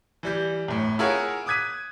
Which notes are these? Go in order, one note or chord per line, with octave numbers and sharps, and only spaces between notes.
E3 G3 G6
G1 A2
E4 F4 G#4 A#4 C#5 F#5
D6 D#6 F#6 G#6 B6 D#7